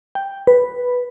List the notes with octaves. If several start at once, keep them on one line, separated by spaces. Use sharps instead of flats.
G5
B4